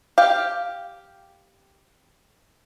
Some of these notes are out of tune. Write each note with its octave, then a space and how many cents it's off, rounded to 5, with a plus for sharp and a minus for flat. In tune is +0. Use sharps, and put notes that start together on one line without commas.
G4 +0 F5 +0